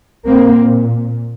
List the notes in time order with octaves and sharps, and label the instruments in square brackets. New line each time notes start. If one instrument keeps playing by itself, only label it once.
[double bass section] A#2 A#3 C4